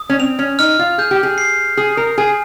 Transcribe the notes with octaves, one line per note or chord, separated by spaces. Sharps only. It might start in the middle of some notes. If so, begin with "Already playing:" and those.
Already playing: D#6
C#4
C4 F7
C#4
D#4 F6
F4
G#4 G6
G4
G#4
C7
G#4 D#6
A#4
G#4 G#5